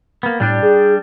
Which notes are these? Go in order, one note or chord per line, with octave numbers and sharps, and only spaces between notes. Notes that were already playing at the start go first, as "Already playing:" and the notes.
A#3 B3
A2 G3 D4 G4
G#4